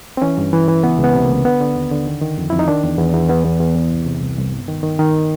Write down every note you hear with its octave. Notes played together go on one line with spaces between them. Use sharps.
C4
E3 C#4
G2
E3
E3
C#2 B3
C#2 B3
C3
C#2 A#3
D3 B3
D3
D#2
D3
D#3
D#3
F2
F2 E4
D#4
D#3 D4
E2
E2
E2
E2 B3
E2
E2
E2
C2
C3
C2
C2
G2
D#3
D#3
D#3